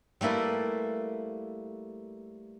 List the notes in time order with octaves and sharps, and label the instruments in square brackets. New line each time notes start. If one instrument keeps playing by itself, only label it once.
[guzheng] G3 A3 A#3 E4 B4